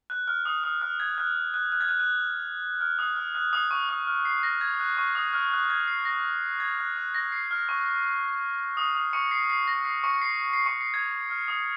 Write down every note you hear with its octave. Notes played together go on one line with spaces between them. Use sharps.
F#6
F6
D#6
D#6
F6
G#6
F#6
F#6
F#6
G#6
F#6
F#6
F6
D#6
F6
F#6
D#6
C#6
D#6
F6
C7
A#6
G#6
F#6
C#6
D#6
F6
F#6
G#6
C7
A#6
G#6
F#6
F#6
A#6
C7
F6
C#6
D#6
D#6
C#6 C#7
C7
C7
A#6
C7
C#6 C#7
C7
C7
C#6 C#7
C7
G#6
F6
D#6